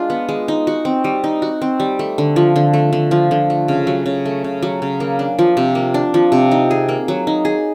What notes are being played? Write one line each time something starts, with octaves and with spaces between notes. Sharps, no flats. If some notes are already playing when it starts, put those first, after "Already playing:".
Already playing: G#3 D4 F4
B3
G#3
D#4
F#4
C4
G3
D#4
F#4
C4
G3
A3
D3
F3
D3
A3
D3
F3
D3
A3
C#3
F#3
C#3
A3
C#3
F#3
C#3
A#3
D4
F3
C3
A#3
D4
F3
C3
D#4
G#4
A#3
F#3
D#4
G#4